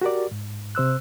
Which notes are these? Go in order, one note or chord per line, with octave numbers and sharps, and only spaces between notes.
F#4 G4 A#4 D5
G#2
C3 C5 E6 F#6